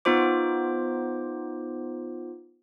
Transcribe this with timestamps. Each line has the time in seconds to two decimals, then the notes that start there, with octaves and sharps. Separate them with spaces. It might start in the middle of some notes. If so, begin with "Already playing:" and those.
0.05 B3 D#4 F4 C5 D6